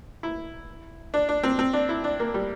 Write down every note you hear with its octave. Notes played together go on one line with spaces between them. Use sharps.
E4
D4
D4
C4
C4
D4
E4
D4
A#3
G3